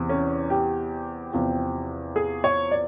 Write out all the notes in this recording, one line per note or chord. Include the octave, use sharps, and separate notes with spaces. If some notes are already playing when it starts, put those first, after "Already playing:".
Already playing: E2 C3 E3
C#4
G4
E2 C3 F3
G#4
C#5
D5